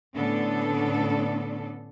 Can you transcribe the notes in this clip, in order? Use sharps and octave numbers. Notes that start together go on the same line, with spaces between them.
A2 D3 B3 C#4 D4 A4